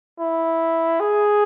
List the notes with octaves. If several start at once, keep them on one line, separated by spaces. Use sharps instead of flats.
E4
G#4